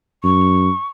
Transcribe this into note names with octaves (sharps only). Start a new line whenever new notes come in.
F#2 C#6